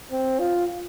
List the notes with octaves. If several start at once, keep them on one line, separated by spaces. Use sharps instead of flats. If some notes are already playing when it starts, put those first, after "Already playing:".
C4
F4